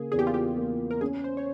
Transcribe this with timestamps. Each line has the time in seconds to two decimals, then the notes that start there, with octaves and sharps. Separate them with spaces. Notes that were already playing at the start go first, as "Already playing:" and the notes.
Already playing: C#3 A#3 G#4
0.12 E2 G#4
0.19 G4
0.27 F4
0.34 G4
0.57 A#3
0.91 A#4
1.01 C#4 G#4
1.24 C5
1.37 C#5